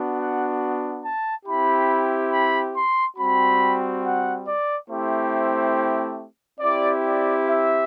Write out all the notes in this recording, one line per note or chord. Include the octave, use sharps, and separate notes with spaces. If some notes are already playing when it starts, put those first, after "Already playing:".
Already playing: B3 D4 F#4
F#5
A5
C4 E4 G4 B5
B5
C6
G3 C4 F#4 B5
F#5
D5
A3 C4 E4 G4 C5
C4 E4 G4 D5
D5
E5